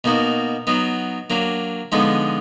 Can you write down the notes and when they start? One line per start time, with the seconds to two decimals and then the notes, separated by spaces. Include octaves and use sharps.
0.04 B2 A#3 D#4 F#4
0.67 F#3 B3 D#4
1.30 F#3 A#3 D4
1.92 D3 F3 G#3 B3 D#4